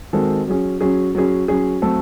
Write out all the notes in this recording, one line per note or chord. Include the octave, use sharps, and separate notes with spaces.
D#3 G#3 C4 F#4 A4
F#3 C#4 G#4
F#3 C#4 G#4
F#3 C#4 G#4
F#3 C#4 G#4
F#3 A3 C4 F#4 A4